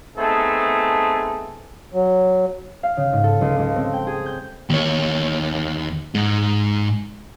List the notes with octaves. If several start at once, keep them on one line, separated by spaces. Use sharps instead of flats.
A3 B3 C4 D#4 G#4 A4
F#3
F5
C#3
G#2
A4
C#2
C#2
C4
G5
G#4
G6
D#2 C#5
G#2 D#4